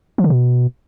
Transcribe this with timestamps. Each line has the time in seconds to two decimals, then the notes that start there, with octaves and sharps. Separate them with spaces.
0.18 F3
0.24 D3
0.30 B2